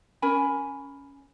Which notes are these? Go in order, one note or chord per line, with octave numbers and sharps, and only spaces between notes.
C#4 A#4 G#5 B5